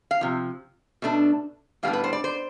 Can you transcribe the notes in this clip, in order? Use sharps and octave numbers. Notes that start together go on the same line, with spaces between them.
F5
C3 F3
B2 A3 D4
A2 G3 B3 D4 F5
B4
C5
D5
C5